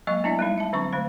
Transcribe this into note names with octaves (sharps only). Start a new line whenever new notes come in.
F#3 G#3 A#3 D#5 C#6
B3 D4 E4 D5 E5
G3 G#3 D#4
E5 A5
D3 F#3 C4 D4 C#6
D3 A3 C5